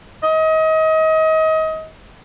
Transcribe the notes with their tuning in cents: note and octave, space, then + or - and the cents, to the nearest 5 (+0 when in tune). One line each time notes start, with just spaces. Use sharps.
D#5 +30